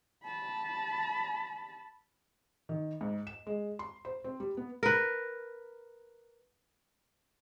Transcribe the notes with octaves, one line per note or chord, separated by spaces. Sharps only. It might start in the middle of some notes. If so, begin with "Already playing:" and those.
A5 B5
D#3
G#2
E7
G#3
C6
C5
C4
G3
B3
A#4 B4